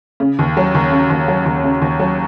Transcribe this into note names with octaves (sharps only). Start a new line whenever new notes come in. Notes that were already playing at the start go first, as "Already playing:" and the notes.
C#3
D#2
F#3
D#2
C#3
D#2
F#3
D#2
C#3
D#2
F#3